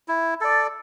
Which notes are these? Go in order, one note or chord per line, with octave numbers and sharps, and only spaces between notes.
E4
A4 D5